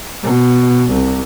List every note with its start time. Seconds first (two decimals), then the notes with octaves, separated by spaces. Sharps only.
0.24 B2
0.91 C2